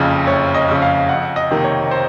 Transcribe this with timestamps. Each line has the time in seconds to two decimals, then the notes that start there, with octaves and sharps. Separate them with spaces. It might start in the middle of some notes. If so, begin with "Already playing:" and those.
Already playing: F#1 F2 C#3
0.27 F#1 C#5
0.55 D#5
0.68 F2 C#3
0.82 F5
1.09 F2 F#5
1.36 D#5
1.50 C3 D#3 A#3
1.64 C#5
1.91 C5